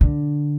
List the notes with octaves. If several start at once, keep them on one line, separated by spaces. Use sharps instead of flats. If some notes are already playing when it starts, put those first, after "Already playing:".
D3